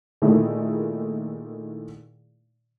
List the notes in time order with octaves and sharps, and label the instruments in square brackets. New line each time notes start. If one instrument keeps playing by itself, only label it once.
[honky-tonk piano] A#2 D#3 A3 D#4 E4 G#4